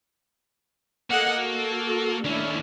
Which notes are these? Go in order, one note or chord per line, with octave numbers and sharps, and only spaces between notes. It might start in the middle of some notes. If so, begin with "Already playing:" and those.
A#3 A4 D#5 F#5
F#4 A4
D#2 A3 C#4 D4 E4